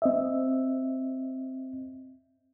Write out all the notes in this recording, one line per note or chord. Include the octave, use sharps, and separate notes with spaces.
C4 D#5 E5